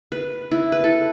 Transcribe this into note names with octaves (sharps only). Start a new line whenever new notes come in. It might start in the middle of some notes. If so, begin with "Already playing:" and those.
B4
E4
B4
A4